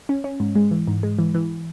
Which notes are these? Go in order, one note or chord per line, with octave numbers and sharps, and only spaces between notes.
C#4
C#4
G#2
G#3
E3
G#2
G#3
E3
E3